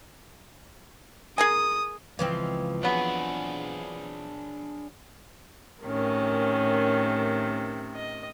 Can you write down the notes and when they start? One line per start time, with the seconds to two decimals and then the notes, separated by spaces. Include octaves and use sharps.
1.38 G#4 A#4 G#5 D#6
2.19 C#2 E3 F3 C4
2.83 F#3 B3 D4 G#4
5.82 A2 C3 D#3 C#4 A#4
7.95 D#5